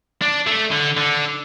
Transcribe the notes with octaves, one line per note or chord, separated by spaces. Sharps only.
D4
A3
D3
D3